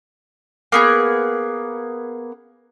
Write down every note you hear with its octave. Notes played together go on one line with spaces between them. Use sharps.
A#3 B3 G#4